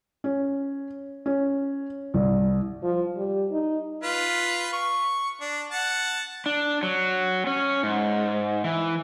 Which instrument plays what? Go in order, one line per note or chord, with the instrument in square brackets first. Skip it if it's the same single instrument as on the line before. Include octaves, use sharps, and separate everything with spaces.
[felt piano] C#4
C#4
C2
[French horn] F3
G3
D#4
[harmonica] F4 B4
C#6
D4
F#5 A5
[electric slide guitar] D4
F#3
C#4
G#2
E3